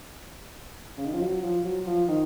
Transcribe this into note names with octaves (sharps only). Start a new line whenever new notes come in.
C#3
D#3
F3
F#3
F3
F#3
F3
D#3